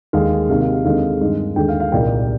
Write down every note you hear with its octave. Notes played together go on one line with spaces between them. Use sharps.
D#2 D3 G#3 D4 F5
C3 D#3 A#3 F5
F5
F5
D#2 D3 G#3 C4 D#4 F5
G2 D#3 G#3 D#4
D#2 D3 G#3 G5
F5
F5
C2 A#2 G3 A#3 D#4 G5